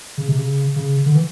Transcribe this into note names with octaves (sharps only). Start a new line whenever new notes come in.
C#3
C3
C#3
C#3
D3
E3